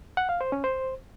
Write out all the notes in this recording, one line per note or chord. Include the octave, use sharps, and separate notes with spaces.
F#5
F5
C5
C#4
C5